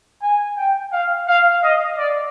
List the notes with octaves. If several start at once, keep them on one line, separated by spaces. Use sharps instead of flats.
G#5
G5
F5
F5
D#5
D5